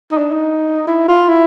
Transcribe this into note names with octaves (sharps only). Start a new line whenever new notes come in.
D#4
D4
D#4
E4
F4
E4